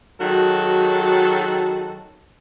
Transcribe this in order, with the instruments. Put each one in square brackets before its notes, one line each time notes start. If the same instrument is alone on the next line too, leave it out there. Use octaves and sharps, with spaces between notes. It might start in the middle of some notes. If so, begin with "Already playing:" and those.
[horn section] D#3 F#3 G#3 F#4 A4